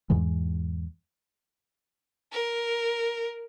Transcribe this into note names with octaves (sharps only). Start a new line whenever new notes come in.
E2 G#2 E3 G#3
A#4